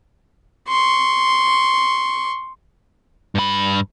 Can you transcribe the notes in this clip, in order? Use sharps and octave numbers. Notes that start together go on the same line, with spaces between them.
C6 C#6
G2 B5